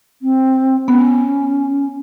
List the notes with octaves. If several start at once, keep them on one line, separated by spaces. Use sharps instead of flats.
C4
B3 C#4